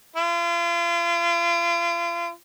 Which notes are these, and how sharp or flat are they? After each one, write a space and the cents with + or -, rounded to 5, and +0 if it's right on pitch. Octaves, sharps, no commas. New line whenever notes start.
F4 -40